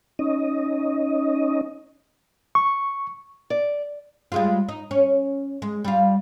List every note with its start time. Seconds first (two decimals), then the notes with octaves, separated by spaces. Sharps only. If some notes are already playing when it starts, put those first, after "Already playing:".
0.19 C#4 D#4 D#5
2.55 C#6
3.50 D5
4.32 G3 G#3 F4
4.69 D#4
4.91 C#4
5.62 G#3
5.85 G3 F4